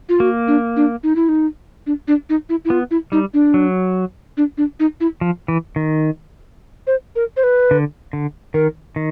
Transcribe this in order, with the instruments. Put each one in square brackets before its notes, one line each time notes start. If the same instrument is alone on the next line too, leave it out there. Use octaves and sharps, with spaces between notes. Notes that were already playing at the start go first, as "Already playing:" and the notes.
[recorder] F4
[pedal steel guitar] A#3 [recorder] F#4
[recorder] D4
D4
D#4
E4
D#4
D4
D4
D#4
E4
E4
[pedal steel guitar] B3 [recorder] F4
[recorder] E4
[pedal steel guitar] G3 [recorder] D#4
[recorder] D4
[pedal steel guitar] F#3
[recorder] D4
D4
D#4
E4
[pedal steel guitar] F3
E3
D#3
[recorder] C5
A#4
C5
B4
[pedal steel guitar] D3
D3
[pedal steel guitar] D#3 [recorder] A#4
[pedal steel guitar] D#3